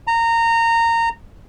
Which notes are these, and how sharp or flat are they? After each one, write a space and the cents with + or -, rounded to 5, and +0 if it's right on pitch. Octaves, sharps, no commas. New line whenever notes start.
A#5 -20